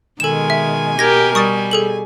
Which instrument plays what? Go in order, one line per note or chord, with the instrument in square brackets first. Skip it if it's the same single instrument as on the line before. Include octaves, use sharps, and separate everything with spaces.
[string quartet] B2 G#5 [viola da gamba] D#3 G#3 [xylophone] A4 E7
[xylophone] E5
[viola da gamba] G4 A#4 [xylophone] G#6 A#6
[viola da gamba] G3 [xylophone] C#6 D#6 A6
[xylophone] G#4 A4 F#7